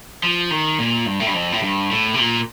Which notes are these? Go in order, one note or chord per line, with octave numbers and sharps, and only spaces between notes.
F3
D#3
A#2
G2
A2
G2
F2
A2
G2
A2
C3
A#2